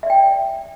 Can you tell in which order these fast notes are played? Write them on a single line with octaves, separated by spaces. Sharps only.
E5 D5 G5